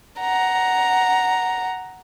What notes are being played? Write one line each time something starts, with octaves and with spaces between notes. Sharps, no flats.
F#5 A#5